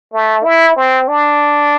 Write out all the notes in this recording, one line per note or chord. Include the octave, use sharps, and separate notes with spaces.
A3
E4
C4
D4